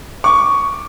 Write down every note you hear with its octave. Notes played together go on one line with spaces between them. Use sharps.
C#6 D6